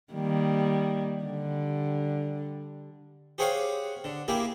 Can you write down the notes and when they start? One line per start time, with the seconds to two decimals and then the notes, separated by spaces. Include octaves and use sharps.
0.14 D#3 G3 A#3
1.24 D3 G3
3.38 G4 G#4 C5 C#5 F5 F#5
4.04 D3
4.28 A#3 E4 G4 G#4